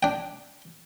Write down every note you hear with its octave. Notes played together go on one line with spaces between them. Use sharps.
D4 G5